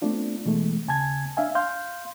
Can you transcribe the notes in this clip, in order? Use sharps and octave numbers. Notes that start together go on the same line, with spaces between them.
A3 B3 C4 D4 F4
B2 E3 G#3 A3
D#2 C#3 G#5 A5 G#6
D4 E5 F5 G#5
F5 C6 G6